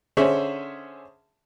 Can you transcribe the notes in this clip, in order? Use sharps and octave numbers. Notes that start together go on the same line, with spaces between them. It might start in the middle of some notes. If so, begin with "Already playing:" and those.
D3 C#4 G#4 C5 E5 C#6